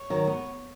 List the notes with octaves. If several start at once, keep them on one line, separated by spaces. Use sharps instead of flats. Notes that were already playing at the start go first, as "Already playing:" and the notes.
Already playing: C#5
D#3 F#3
B3